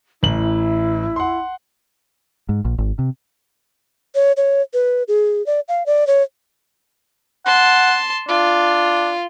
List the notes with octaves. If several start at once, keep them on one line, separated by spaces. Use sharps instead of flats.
A1 E4 F#7
F#5 C6
G#2
A#1
G#1
C3
C#5
C#5
B4
G#4
D5
F5
D5
C#5
F#5 A5 C6
D4 F4